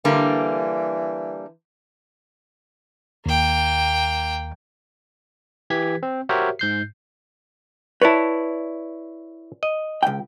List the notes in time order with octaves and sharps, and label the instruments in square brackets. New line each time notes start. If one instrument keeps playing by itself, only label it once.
[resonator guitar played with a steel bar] D3 G3 A#3 [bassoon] E3
[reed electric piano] D#2 [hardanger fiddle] A#3 G5
[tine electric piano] E3 G4 G#6 B6
C4
F#4 G4 A#4 C5 C#5 E5
G#2 G6 C7
[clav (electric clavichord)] E4 C#5 [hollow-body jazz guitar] B4 D5 A5
[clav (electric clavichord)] D#5
[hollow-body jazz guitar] C#2 G5